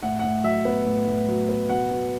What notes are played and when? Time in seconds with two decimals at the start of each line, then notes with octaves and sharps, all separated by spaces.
0.03 A2 F#5
0.19 A2 F#5
0.44 F#3 E5
0.65 B3
0.86 A2
1.07 A2
1.28 F#3
1.49 B3
1.69 B2 F#5
1.91 B2